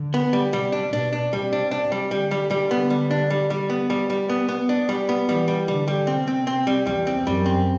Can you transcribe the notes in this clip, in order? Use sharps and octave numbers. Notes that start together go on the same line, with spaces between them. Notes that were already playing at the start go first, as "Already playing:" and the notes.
Already playing: D3
B3
G3
C3 G3
D4
B2 D4
D4
C3 G3
D4
D4
G3
D3 G3
G3
G3
B3
G3
D4
G3
G3
B3
G3
G3
B3
B3
D4
G3
B3
E3 G3
G3
D3 G3
G3
C3 C4
C4
C4
G3
E2 G3
C4
F#2 G3
C4